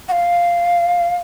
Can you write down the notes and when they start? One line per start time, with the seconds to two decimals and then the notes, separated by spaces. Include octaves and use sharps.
0.09 F#5
0.12 F5